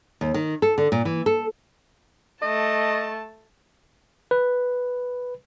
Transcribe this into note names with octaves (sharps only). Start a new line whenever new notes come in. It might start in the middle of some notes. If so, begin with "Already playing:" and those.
D#2
D#3
A4
D3
A#2
E3
A4
A3 D#5 A5
B4